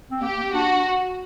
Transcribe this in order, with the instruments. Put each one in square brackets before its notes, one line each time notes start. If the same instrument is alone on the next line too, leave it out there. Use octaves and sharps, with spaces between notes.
[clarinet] C4
[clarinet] A#3 [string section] G4
[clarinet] A#3
[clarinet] D4 [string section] F#4